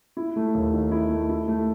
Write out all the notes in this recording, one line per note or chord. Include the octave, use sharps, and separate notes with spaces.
E4
A3
D#2
D#3
E4
A3
E4
A3